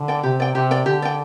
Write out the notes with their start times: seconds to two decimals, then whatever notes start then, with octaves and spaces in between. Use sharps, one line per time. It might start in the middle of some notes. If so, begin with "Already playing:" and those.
Already playing: D3
0.08 D5 G5
0.23 C3 G4
0.40 D5 G5
0.55 C3 G4
0.71 D5 G5
0.86 D3 G4
1.02 D5 G5